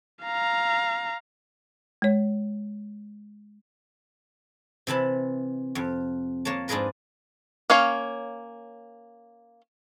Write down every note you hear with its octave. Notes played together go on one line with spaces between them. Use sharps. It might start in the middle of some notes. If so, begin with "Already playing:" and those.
F5 A#5
G#3 C#5
C3 E3 A5 B5
F2
A#3 C#5 A5
G#2 D4 F4 G#4 A#4 B4
A#3 C#4 C#5 F5